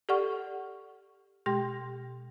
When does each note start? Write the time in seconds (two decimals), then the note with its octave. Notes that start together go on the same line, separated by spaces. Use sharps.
0.09 G4 A4 D5 F#5 C#6 F6
1.46 B2 G#3 G4 G5 C6 A#6